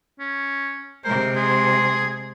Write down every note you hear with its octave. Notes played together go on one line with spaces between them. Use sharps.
C#4
C3 G#3 A#4 C5
G#4 C6